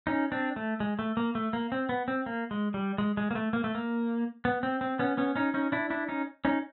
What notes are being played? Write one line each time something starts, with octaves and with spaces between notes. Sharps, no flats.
C#4 D#4
C4 D4
A3
G#3
A3
A#3
A3
A#3
C4
B3
C4
A#3
G#3
G3
G#3
G#3
A#3
A3
A#3
A3
A#3
B3
C4
C4
B3 C#4
B3 C#4
C#4 D#4
C#4 D#4
D4 E4
D4 E4
C#4 D#4
C#4 D#4